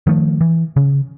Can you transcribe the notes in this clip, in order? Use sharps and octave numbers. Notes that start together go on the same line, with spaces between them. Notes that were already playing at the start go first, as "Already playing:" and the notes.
D#3 F3 A3
E3
C#3